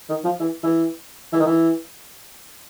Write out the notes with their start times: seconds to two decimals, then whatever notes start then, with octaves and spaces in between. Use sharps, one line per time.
0.09 D#3
0.24 F3
0.40 E3
0.63 E3
1.32 E3
1.40 D#3
1.46 E3